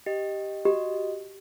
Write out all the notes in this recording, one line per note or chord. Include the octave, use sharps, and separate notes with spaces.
G4 D#5
F#4 G4 D#5